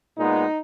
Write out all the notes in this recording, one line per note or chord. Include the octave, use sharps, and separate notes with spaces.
A#2 G#3 B3 D#4